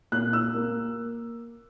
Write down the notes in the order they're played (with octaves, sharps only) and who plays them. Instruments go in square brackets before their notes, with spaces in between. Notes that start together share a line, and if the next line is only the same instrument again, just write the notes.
[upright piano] A#2 F#6
E6
A#3